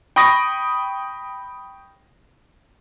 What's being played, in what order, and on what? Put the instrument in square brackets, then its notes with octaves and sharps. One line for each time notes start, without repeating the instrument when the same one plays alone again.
[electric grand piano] G5 B5 C#6 D#6 A#6